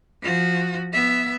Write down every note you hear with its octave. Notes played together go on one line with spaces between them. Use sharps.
F3 F#4
B3 E5